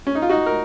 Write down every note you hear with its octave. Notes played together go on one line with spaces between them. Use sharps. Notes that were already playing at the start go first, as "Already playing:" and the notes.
C#4
D#4
F4
D#4 F#4
A#4